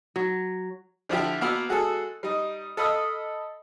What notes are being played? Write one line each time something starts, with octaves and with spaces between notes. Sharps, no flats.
F#3
D3 F3 E4 G4
A#3 B3 F#4 E6
G#3 F#4 G#4 A4
G3 D#4
A4 D#5 F5 B5 D#6 E6